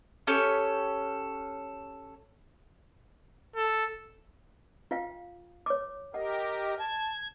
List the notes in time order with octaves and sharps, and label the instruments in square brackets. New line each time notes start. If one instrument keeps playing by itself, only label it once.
[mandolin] C#4 G4 A4 C#5
[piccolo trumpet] A4
[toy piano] F4 F5 G5
C#5 D6
[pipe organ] G4 A#4 [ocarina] D#5 [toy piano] F#5
[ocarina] A5 [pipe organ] G#6